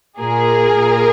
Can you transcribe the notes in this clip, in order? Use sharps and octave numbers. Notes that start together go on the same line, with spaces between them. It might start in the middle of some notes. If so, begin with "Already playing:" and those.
A#2 G#4 A#4
A#2